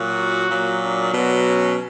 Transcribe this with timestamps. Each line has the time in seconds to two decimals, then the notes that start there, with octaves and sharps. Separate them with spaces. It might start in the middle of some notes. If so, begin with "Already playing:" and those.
Already playing: A#2 F#3 F#4
0.49 A#2 F#3
0.82 D4
1.14 B2 F#3
1.46 C#4